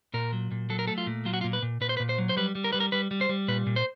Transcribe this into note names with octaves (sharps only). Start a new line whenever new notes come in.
A#2 A#4
F#3
A#2
F#3 A4
A#4
A3 A4
F4
A#2
F#3 F4
F#4
F4
A#2
B4
A#2
A#2 B4
C5
B4
A#2
C5
F#3
C5
G3 B4
G3
A#4
G3 B4
A#4
G3 B4
G3
C5
G3
A#2 B4
A#2
C5